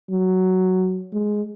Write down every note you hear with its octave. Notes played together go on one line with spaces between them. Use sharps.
F#3
G#3